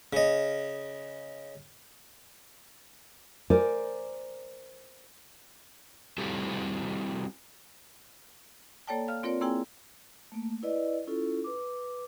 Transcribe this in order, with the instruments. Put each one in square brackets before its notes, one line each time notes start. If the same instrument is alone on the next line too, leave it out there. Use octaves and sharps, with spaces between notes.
[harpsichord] C#3 D#5
[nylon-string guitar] A#4 C5 D5 G#5
[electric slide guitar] G3 C4 E4 F#4 G4 A4
[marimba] A#3 A4 C#5 D5 G5 A5
F5 F6
C4 F4 A#4 C#5 D5
A#3 C4 E4 G#4 G5 G#5
[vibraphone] A3 A#3
E4 B4 D5 D#5
C#4 E4 F4 A4
B4 D6